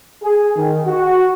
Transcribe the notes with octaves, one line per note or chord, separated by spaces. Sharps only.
G#4
D#3
F#4